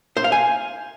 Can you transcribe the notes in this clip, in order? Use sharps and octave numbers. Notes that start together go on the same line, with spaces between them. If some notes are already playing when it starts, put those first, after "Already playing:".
C5
F5
G#5